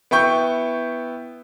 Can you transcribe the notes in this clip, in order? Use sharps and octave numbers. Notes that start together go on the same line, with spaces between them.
B3 E4 G5 C#6 G6